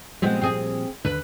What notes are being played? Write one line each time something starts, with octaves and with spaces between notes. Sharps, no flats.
A#2 F3 G3 G#3 B3 C4
C4 G#4
D#2 D3 B4